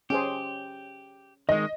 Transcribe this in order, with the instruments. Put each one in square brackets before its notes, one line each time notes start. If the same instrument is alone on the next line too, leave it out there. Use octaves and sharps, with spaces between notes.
[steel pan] C#4 G#4 C5 [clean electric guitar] G4
[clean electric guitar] D#3 G#3 [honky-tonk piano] D#5